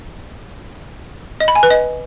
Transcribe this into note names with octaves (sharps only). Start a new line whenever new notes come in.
D#5
B5
G#5
B4
D#5